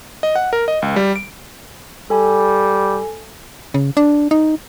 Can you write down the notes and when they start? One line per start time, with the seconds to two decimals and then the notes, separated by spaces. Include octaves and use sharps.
0.23 D#5
0.35 F#5
0.53 A#4
0.68 D#5
0.82 C#2
0.96 G3
1.16 D7
2.10 G3 A4 G#5
3.74 C#3
3.97 D4
4.31 D#4